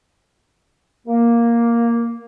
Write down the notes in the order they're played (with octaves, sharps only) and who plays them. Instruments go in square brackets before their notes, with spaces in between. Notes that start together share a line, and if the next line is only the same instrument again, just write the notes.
[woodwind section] A#3